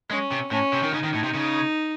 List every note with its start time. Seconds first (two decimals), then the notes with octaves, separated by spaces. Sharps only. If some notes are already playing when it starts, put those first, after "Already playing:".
0.10 G#3 C#4
0.31 C3
0.51 A2 C#4
0.73 C3
0.83 D#3
0.94 C#3 D#4
1.04 D#3
1.14 A2
1.24 C3
1.35 C#3